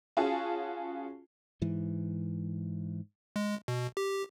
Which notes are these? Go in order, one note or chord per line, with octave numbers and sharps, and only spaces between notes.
C#4 F4 F#4 G#4 G#5 A5
G#2 E3
G#3
B2
G4